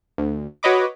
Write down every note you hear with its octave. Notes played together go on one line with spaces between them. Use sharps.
D2
F#4 B4 C#5 D#5 B5 D6